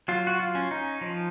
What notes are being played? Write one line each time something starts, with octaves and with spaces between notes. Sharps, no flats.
F#3 F4
F#4
F4
C#4
D#4
F3